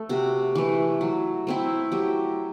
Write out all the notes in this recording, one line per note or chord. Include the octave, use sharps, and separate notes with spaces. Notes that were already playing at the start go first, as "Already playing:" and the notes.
Already playing: A3 A4
C3 F#4
E3 A3
F#3
A3 C4 E4
F#3 G4